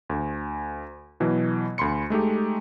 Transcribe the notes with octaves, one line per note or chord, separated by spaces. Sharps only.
D2
B2 E3 F#3
D2 B5 C6 C#7
G#3 A3 D#4 G4